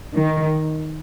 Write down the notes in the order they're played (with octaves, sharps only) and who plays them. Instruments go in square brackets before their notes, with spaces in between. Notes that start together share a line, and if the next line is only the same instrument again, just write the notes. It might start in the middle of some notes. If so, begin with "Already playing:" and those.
[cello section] D#3